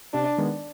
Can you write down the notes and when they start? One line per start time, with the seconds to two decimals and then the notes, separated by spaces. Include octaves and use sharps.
0.14 C3 D4
0.38 D#3 G#3 B3